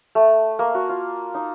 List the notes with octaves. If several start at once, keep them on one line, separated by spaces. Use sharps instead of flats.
A3
A#3
F#4
F4
D#4